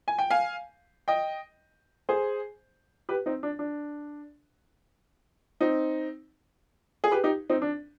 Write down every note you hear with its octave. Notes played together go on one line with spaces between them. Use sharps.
G#5
G5
F5 G#5
D#5 G5
G#4 C5
G4 B4
C4 D#4
D4
D4
C4 D#4
G#4
G4 B4
D#4 G4
C4 D#4
D4